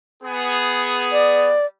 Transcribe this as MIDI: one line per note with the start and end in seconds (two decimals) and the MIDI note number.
0.23 1.55 59
0.23 1.55 68
1.12 1.66 74